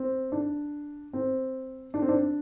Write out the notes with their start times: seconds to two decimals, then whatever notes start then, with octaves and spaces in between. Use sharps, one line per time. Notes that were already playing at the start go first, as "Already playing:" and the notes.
Already playing: C4
0.32 D4
1.13 C4
1.94 D4
2.02 C4
2.09 D4